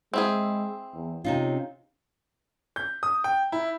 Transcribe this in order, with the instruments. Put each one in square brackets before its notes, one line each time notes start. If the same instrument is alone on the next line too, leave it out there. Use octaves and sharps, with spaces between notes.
[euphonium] G#3 [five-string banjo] C4 E4 G#4
[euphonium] E2
[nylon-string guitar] C3 D#4 F4 [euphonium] C#4
[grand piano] G6
D#6
G5
E4